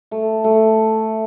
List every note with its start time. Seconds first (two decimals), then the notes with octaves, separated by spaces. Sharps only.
0.11 A3
0.44 A3